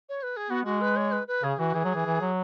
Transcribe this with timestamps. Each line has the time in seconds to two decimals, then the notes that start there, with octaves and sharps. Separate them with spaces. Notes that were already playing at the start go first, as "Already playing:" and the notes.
0.09 C#5
0.23 B4
0.36 G#4
0.50 B3 F#4
0.65 G#3 F#4
0.81 B4
0.96 C#5
1.12 B4
1.27 B4
1.43 C#3 G#4
1.59 E3 F#4
1.74 E3 G#4
1.85 F#3
1.95 E3
2.06 E3
2.21 F#3